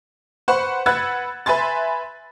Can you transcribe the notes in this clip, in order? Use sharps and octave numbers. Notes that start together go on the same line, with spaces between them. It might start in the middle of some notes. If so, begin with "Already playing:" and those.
B4 C5 F#5 C#6 F#6
B4 F#5 E6 F#6 G#6 A6
B4 E5 G#5 C6 A6